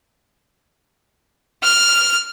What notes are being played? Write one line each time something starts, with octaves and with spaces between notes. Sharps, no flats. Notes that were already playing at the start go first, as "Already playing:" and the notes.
F6